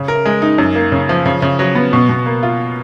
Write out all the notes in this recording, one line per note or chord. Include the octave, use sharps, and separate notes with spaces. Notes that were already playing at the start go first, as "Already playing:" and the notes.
Already playing: C#3
A#4
G#3
D#4
F#2
A#3
C#3
F3
C#3
C#3
F#3
B3
B2
B2
A#3
F4